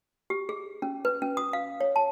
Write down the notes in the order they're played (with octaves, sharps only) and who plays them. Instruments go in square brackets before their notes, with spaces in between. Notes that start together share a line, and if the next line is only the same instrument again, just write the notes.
[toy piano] G4
G#4
C#4
B4
C#4
D#6
F5
C#5
A5